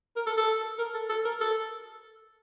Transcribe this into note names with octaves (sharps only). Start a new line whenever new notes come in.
A#4
A4
A4
A#4
A4
A4
A#4
A4